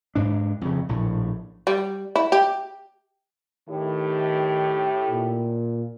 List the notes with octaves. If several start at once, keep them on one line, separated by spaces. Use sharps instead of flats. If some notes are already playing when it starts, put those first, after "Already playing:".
G#2 D4
F2 C#3
A#1 A2
G3
E4
G4
A2 D#3 G4
A#2